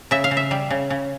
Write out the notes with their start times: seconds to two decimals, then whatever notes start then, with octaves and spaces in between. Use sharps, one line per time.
0.11 C#3 E5
0.24 F5
0.31 C#3
0.37 E5
0.51 G3
0.71 C#3
0.90 C#3